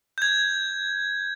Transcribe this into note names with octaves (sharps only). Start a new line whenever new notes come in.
G6 G#6